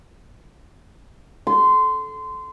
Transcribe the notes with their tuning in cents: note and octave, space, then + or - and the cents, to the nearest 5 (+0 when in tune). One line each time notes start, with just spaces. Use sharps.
C6 -20